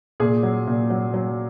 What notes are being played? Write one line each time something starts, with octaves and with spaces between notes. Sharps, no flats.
A#2 G#4
F#3
A#2
F#3
F#3